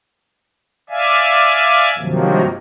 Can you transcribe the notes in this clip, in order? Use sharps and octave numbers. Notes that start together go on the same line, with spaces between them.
D5 E5 F5 G#5
G2 C3 D#3 F3 F#3 A#3